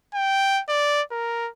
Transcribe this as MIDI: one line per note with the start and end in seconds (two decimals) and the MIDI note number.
0.14 0.61 79
0.69 1.02 74
1.11 1.49 70